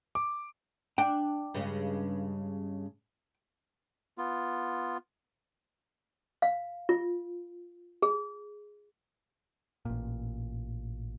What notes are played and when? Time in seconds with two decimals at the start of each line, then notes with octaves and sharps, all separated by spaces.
0.15 D6
0.98 D4 G5
1.54 G2 C#3 G#3
4.18 B3 F4
6.42 F5
6.89 F4
8.02 G#4
9.85 A1 A#2